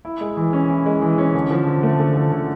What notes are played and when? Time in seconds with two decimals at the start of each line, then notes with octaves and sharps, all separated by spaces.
0.05 E4
0.21 G#3
0.37 E3
0.53 C#4
0.69 E4
0.86 G#3
1.02 E3
1.18 C#4
1.35 D3
1.51 F3
1.67 D3
1.83 A3
2.00 D3
2.15 F3
2.32 D3